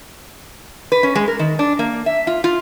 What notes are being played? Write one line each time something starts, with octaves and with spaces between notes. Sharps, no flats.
B4
C#4
G#3
A#4
D#3
D4
A#3
E5
F4
F4